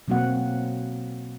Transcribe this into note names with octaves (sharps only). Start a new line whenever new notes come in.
B2 F#3 A#3 C4 F#4 F#5